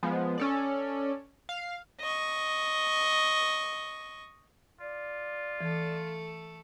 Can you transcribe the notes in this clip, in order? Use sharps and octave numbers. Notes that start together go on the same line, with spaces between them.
F3 G#3 B3
C#4 A4 D5
F5
D#5 C#6
F4 D5
E3 A3 A4